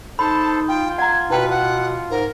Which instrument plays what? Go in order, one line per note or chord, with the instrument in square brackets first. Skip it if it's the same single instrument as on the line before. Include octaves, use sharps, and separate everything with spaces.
[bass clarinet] D#4 [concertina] A4 C5 [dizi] A5 [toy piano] B5
[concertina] F4 [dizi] G5
[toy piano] F#5 A#5 [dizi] G#6
[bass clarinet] B2 [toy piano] E4 G5 [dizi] B4
[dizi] F#5
[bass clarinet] G#2 [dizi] A#4